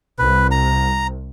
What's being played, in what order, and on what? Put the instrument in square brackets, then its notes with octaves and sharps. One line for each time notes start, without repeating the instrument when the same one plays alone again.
[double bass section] C2 [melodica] B4
[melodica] A#5